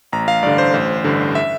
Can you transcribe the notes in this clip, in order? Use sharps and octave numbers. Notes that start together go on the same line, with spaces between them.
A1 A#5
F5
G2 D3 D5
C5
A1 C5
G2 D3
E5